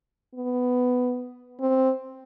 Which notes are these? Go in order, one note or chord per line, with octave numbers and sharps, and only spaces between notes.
B3
C4